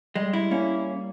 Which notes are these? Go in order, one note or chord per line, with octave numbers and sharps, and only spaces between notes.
G3 G#3
G3 E4
A#3 C#4